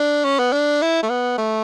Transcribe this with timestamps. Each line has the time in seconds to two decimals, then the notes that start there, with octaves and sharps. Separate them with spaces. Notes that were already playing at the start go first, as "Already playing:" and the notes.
Already playing: D4
0.24 C#4
0.39 B3
0.53 D4
0.82 E4
1.03 A3
1.10 B3
1.38 A3